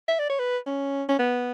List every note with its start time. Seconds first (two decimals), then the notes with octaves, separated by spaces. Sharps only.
0.08 E5
0.19 D5
0.30 C#5
0.39 B4
0.66 C#4
1.09 C#4
1.19 B3